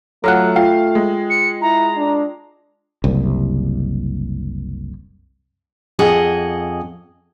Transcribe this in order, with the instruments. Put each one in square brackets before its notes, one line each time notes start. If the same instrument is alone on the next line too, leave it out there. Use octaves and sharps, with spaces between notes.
[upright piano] F#3 F4 F#5 [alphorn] A3 [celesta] A4 F6 F#6
[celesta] F4 G5 [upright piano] F5
[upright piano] G#3
[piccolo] C#7
[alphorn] E4 [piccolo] A#5
[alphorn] D4
[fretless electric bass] F#1 C2
[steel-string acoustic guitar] F2 G#4 D#5 F#5